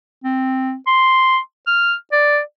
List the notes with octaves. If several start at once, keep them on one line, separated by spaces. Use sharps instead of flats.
C4
C6
F6
D5